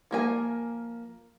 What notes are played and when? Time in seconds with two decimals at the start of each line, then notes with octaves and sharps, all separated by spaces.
0.11 F3 A#3 G#5